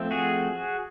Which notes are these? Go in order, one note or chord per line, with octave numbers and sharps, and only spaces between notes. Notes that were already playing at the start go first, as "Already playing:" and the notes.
Already playing: F3 A3 C4
F#4 G#4